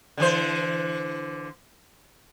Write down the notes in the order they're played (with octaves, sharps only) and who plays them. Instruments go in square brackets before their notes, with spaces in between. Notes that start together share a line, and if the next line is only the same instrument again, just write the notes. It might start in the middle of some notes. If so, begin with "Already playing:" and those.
[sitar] D3 E3 C5